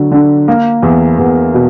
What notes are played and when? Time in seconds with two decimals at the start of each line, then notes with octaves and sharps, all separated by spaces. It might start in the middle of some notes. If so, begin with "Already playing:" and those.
Already playing: D3 F#3
0.11 D3
0.48 A#3
0.82 E2
1.19 E2
1.54 B2